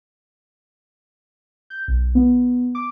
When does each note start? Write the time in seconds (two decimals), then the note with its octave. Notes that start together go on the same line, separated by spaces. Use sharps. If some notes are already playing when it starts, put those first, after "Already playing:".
1.70 G6
1.88 B1
2.15 B3
2.75 D6